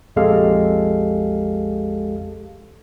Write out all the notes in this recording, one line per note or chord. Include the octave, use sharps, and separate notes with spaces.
A#1 F2 G#3 G4 A4 F5